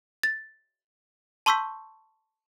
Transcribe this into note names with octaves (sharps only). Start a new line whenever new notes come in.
A6
A5 C6 C#6 E6 G6 B6